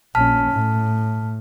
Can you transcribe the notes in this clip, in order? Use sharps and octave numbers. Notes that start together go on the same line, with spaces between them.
A#1 C#4 A5 F6 B6
A2